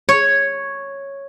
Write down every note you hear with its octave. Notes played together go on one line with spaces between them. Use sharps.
C#5